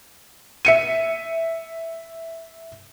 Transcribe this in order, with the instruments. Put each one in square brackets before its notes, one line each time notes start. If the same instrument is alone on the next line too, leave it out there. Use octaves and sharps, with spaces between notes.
[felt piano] E5 C#7 D#7